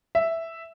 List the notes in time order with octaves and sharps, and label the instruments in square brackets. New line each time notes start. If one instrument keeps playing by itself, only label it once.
[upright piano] E5